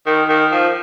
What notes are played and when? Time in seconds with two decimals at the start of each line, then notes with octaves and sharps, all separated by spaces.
0.06 D#3
0.28 D#3
0.51 F3